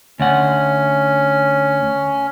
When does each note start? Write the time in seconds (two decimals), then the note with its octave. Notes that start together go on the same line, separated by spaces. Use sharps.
0.20 D2 C#4 F#5